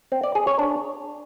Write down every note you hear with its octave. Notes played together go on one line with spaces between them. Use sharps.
C4
D5
G#4
C#5
D4